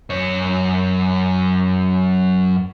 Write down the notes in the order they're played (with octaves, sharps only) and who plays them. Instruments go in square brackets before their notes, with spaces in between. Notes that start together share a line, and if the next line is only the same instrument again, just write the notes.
[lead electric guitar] F#2 C#5